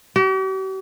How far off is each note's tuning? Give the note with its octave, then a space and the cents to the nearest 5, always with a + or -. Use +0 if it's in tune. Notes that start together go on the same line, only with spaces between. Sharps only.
G4 -45